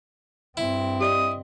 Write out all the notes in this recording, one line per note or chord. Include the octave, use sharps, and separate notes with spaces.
G2 C4 E4
G4 D5 D#5 D#6